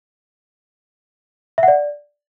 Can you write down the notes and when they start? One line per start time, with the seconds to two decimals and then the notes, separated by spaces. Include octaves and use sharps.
1.58 E5
1.63 F#5
1.68 D5